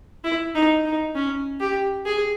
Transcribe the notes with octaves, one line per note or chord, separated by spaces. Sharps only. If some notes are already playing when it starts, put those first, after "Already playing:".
E4
D#4
D#4
C#4
G4
G#4